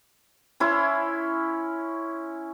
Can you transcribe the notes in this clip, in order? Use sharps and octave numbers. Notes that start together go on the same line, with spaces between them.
C#4 E4 C6